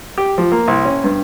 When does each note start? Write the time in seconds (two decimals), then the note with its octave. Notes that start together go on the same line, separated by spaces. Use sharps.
0.18 G4
0.38 F3
0.52 A#3
0.68 C2
0.85 C#4
1.04 G2